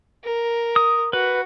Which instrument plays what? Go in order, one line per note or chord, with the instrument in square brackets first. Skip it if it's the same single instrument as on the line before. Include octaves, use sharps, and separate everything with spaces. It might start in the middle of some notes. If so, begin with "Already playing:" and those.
[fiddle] A#4
[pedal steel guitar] D#6
[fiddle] F#4 [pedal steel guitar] B4